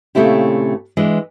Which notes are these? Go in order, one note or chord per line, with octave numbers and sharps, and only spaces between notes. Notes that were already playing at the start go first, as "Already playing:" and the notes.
A#2 C#3 A3 C4 E4 G4
E3 G#3 D4